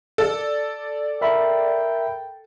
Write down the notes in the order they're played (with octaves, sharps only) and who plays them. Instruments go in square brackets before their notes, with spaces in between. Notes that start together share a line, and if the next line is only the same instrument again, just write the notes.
[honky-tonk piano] A4 [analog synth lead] D5
[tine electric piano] A#4 E5 B5 [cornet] G5